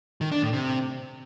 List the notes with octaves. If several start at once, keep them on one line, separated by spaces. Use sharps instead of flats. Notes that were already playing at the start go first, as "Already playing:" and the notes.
D#3
D4
A2
C3